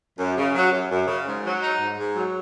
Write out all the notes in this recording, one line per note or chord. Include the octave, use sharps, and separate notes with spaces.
F#2
C#3
F#3
F#2
F#2
C#3
G#2
F#3
D#4
G#2
G#2
F#3